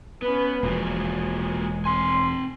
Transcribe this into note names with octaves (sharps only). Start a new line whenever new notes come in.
B3 C#4 B4
E1 F3 G#3 A#3 F4 F#4
C4 G#5 C6